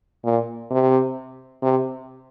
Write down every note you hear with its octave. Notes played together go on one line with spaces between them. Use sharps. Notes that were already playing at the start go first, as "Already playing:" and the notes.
A#2
C3
C3